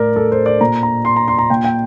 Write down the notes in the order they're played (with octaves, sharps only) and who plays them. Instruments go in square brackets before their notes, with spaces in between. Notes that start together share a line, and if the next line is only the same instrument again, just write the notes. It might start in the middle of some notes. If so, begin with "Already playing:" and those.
Already playing: [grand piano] A2 A#4 D5
A4
C5
D5
A#2 A#5
A#5
C6
A#5
C6
A#5
A#2 G5
G5